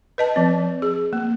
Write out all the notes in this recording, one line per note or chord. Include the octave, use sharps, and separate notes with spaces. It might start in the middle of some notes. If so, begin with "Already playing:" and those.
B4 D#5 A5
F3 C4
G#4
A#3